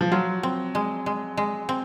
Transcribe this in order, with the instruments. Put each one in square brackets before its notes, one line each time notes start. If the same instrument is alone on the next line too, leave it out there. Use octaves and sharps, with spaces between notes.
[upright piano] F3
[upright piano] F#3 [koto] F4
[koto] C4
G#3
G#3
G#3
C4